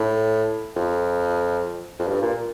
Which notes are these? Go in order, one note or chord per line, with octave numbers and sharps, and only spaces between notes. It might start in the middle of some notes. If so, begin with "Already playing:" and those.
Already playing: A2
F2
F2
G2
A#2